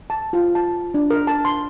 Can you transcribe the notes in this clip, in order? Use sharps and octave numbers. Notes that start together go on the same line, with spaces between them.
A5
F4
A5
D4
A#4
A5
C6